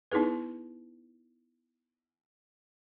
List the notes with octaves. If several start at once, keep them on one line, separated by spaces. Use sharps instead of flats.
B3 D#4 E4 G#4 B4